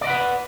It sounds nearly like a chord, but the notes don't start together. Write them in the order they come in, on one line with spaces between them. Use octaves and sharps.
D5 D#5 F#5 B4